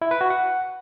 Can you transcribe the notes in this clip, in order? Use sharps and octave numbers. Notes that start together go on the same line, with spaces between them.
E4
B4
F#4
F#5